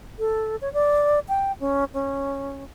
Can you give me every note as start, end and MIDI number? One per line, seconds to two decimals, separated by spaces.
0.19 0.56 69
0.62 0.72 73
0.73 1.19 74
1.29 1.52 79
1.60 1.84 61
1.94 2.64 61